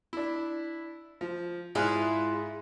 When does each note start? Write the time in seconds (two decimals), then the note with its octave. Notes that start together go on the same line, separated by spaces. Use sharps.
0.13 D4 E4
1.21 F3
1.75 G#2 E4 F4 G#4 F#6